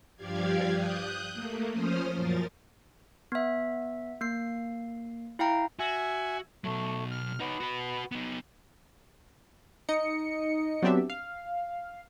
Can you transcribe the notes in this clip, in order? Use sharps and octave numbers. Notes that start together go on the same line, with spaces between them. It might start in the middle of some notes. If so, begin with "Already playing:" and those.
G2 F3 G4 D5 F5 G#6
D#6 F#6 G6
A3 A#3
F3 C#4 C5 D#6 F6
F#2 A#2 F3 A#4 A6
B3 E5
A#3 C7
E4 F5 G5 A#5
F#4 E5 G#5
B2 F#3 A3
F6
B3 D#4 C#5
F#4 B4
B3 D#4
D#4 D#5 C#7
F#3 B3 C4 D4 G4 E5
F5